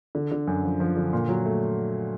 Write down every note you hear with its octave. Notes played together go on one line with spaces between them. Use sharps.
D3
D3
F#2
F3
F3
D3
A#2
F#3
A3